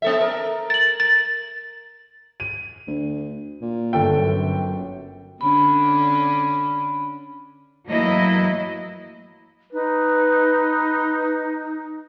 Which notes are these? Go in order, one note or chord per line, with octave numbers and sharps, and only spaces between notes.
B3 A4 E5
A#4
A6 F#7
A6
D#7
D2
A#2
G1 A4 G5
F#2
D3 C#4 D4 B5
E3 F#3 A3 A#3 E4 D#5
D#4 B4